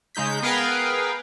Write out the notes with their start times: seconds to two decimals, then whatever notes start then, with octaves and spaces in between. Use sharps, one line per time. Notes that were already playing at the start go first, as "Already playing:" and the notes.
0.15 C#3 G#3 D#4 G6 B6
0.42 B3 G#4 A#4 B4 F5 G5